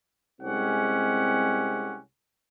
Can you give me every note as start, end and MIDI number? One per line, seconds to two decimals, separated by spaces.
0.41 1.98 36
0.41 1.98 56
0.41 1.98 60
0.41 1.98 61
0.41 1.98 67
0.41 1.98 78